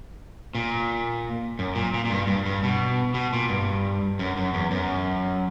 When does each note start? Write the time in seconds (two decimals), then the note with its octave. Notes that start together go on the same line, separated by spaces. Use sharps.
0.55 A#2
1.59 F#2
1.75 A#2
1.94 A#2
2.05 A#2
2.10 G2
2.27 G2
2.46 G2
2.63 B2
3.14 B2
3.33 A#2
3.49 G2
4.19 F#2
4.37 F#2
4.54 E2
4.71 F#2